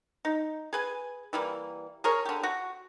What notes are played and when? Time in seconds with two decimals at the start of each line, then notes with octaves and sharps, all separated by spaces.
0.25 D#4
0.73 G#4 B4 G#5
1.33 E3 G3 A#3
2.04 G#4 A#4 C#5
2.25 D3 G4
2.43 F#4